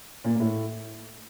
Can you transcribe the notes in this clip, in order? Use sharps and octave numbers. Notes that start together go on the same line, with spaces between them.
A#2 A#3
A#3
A2 A3